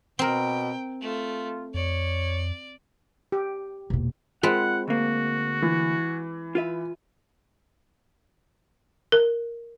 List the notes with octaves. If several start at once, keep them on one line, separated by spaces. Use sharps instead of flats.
B2 C4 A#4 G5
A3 F4
F2 C#5 D5
G4
E1 A#2
G#3 C4 F4 B4 F#5
D2 A#3 F#4
E3
F4 B4 E5
A#4